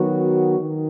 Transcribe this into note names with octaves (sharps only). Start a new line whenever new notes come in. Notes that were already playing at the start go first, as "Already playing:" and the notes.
Already playing: D#3 F#3 B3 F#4
D#3